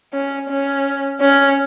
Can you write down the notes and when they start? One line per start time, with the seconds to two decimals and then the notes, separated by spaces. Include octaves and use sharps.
0.13 C#4
0.50 C#4
1.21 C#4